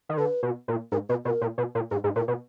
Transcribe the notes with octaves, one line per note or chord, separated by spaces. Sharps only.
D#3
D3 B4
B2
A#2
G#2 A#4
B2 B4
B2 A#4
A#2
B2
A#2
G#2 G#4
G#2
A#2 A#4
B2